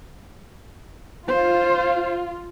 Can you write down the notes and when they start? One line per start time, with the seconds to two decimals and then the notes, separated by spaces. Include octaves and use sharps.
1.28 F4 C5